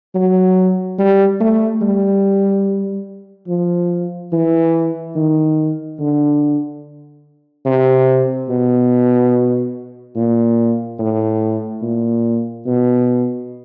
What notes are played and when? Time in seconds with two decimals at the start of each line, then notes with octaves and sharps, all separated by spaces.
0.15 F#3
0.99 G3
1.40 A3
1.82 G3
3.48 F3
4.32 E3
5.16 D#3
5.99 D3
7.65 C3
8.49 B2
10.16 A#2
10.99 A2
11.82 A#2
12.66 B2